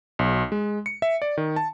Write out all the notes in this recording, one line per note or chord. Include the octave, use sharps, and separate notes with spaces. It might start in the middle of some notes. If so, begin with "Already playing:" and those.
B1
G#3
C#7
E5
D5
D#3
A5